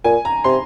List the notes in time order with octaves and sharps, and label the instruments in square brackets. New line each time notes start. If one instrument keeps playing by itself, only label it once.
[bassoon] A#2 [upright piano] G#5
[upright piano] A#5
[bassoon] C3 [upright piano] C6